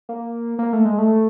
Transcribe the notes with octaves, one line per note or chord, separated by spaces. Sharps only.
A#3
A#3
A3
G#3
A3